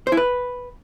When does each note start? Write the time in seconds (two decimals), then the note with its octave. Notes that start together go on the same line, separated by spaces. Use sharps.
0.07 C5
0.12 E4
0.17 B4